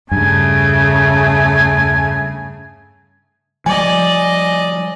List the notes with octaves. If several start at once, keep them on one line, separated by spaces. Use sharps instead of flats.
E2 G2 C#3 A3 G#5
F3 G3 D5 D#5 G#5